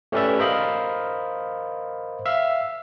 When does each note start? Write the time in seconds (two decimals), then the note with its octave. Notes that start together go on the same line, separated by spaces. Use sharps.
0.12 A3 C#4 G4 B4 D5 E5
0.39 A#4 C5 D#5 F5 B5
2.26 E5 F5